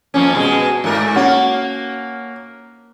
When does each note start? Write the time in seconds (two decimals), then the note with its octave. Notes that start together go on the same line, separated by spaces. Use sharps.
0.14 F2 A#3 C#4
0.35 B2 G#3
0.84 G#2 A3 A#4
1.16 A#3 C#4 F#4